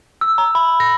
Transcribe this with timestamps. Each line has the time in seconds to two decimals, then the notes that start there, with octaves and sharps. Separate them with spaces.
0.21 E6
0.38 A#5
0.55 B5
0.80 A#6